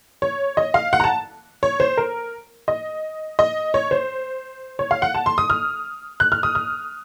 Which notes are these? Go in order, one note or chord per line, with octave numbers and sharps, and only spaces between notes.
C#5
D#5
F5
F#5
A#5
A5
C#5
C5
A#4
D#5
D#5
C#5
C5
C#5
F5
F#5
A5
C6
D#6
F6
F#6
F6
D#6
F6